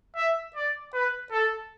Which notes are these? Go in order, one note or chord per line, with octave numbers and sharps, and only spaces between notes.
E5
D5
B4
A4